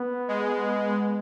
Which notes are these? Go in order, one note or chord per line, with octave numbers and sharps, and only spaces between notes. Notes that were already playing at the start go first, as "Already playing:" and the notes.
Already playing: B3
G#3